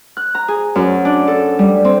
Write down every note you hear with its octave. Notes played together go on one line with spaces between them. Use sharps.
F#6
A#5
G#4
F#2
D4
A4
G3
C4